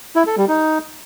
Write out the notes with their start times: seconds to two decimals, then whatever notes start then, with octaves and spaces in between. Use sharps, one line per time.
0.16 E4
0.27 A4
0.38 G3
0.48 D#4